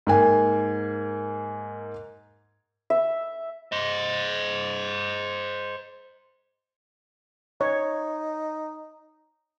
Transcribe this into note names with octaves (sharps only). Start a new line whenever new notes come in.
G#2 A#3 G#5
E5
C5 D#5
D#4 C#5